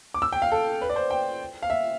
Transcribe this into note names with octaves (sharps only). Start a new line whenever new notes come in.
D6
E6
G5
F5
A4
B4
D5
C5
G5
F5
E5